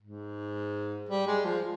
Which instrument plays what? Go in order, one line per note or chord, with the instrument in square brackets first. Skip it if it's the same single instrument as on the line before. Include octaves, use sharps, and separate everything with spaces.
[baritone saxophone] G#2
G3
G#3
F3